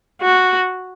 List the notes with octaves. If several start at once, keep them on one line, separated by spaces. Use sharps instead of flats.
F#4